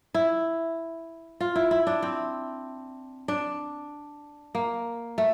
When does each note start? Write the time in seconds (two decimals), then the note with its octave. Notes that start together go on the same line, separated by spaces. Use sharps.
0.14 E4
1.40 F4
1.56 E4
1.71 E4
1.87 D4
2.02 C4
3.28 D4
4.55 A#3
5.18 A3